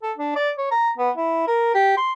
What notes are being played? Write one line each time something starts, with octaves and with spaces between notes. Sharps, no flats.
A4
D4
D5
C#5
A#5
B3
E4
A#4
G4
C6